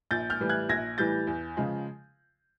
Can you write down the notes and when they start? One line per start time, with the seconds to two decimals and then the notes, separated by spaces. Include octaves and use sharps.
0.11 A#1 G6 A6
0.30 F6 G6
0.40 A2 E3 G3
0.49 F#6 G#6
0.69 A#1 G#6 A#6
0.98 A2 E3 G3 G6 A6
1.27 E2
1.57 C#3 F3 G#3